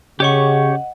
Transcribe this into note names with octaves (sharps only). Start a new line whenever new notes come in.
C#3 G4 C#5 D#5 F#5 C#6